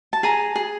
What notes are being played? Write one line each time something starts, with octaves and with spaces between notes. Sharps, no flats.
A5
G#4 G#5 A#5
G#4